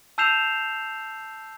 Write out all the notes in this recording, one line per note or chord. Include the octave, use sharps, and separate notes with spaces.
A5 E6 G6 C7 E7 F7